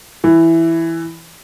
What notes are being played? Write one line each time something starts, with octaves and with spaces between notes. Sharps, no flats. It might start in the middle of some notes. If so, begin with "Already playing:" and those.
E3